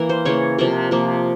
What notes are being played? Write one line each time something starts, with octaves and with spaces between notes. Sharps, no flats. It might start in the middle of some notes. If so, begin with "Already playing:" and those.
Already playing: E3 A#3 A#4
C5
C#3 E3 A#3 C#5
C3 F3 A#3 A#4
C3 F3 A#3